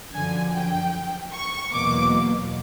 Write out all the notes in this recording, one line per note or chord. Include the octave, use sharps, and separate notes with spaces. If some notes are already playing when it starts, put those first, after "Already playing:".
F#2 D3 F3 G#5
G5
C#6
E2 B2 F#3 A#3 D6